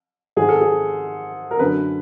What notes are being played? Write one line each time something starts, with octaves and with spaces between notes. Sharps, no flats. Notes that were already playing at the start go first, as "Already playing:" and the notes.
G#2 D#3 G#4
A4
G#4
A#4
F#2 D3 B4